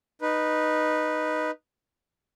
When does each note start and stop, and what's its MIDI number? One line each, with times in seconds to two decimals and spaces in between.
0.22 1.51 63
0.22 1.51 71